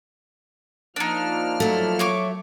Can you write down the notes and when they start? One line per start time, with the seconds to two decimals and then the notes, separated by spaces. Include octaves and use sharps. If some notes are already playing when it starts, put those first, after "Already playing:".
0.96 F3 A#3 D4 D#4 F6
1.60 F#3 A3
1.99 C#5 C#6 D6